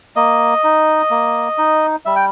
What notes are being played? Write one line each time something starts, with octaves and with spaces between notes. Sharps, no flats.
A#3 D#5
D#4
A#3
D#4
G3 E5
G5